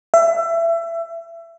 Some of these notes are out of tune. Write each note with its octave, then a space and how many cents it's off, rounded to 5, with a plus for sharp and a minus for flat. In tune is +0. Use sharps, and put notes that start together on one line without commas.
E5 +25